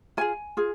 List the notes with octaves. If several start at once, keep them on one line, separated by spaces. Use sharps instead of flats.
F4 G#4 G#5
F4 G#4